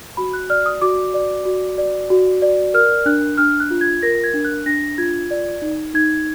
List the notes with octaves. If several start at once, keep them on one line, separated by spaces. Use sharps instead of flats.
F#4 B5
F#6
D5 F6
D#6
F#4 D6
D5
F#4
D5
F#4
D5
A#4 F6
D4 F#6
D4 F6
F#6
F4
G#6
A#4 A#6
G#6
D4
F#6
D4 A#6
F4 G#6
D5
D#4
D#4 G#6